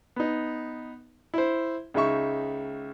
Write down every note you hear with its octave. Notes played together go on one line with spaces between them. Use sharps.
B3 D#4
E4 C5
C#2 G#3 D#4 E5 C#6